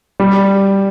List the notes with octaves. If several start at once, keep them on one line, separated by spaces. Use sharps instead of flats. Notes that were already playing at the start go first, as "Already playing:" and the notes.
G3